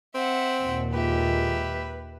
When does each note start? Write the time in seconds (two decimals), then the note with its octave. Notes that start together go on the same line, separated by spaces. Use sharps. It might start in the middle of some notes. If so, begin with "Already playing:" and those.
0.15 C4 E5 F#5
0.60 D#2 A#2
0.93 G#3 A#3 F4 G4 B4 E5